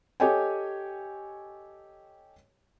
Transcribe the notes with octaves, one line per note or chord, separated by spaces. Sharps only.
G4 A4 C#5 D#5 G5 G#5